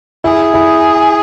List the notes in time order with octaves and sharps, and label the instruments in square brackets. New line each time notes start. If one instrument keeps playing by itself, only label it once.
[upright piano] E4 [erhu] G#4
[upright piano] E4